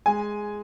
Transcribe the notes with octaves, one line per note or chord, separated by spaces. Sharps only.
G#3 G#5